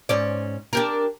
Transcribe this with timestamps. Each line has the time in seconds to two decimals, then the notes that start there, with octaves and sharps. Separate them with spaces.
0.09 G#2 C#4 D5
0.73 D4 G4 A#4